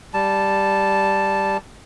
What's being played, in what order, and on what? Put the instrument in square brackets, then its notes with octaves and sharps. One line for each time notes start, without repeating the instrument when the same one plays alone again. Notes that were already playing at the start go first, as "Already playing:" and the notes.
[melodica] G3 A5